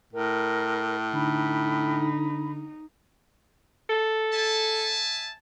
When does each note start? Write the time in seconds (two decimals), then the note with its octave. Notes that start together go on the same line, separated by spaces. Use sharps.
0.13 A2 A#4
1.14 D3 D#4 B5
3.90 A4
4.33 E5 G#5 A5